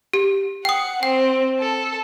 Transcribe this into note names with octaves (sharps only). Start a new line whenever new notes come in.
G4
F#5 G5 D#6
C4 G5
A4